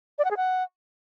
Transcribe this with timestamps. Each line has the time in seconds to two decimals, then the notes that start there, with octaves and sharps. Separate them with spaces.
0.19 D5
0.25 F#5
0.31 G#4
0.37 F#5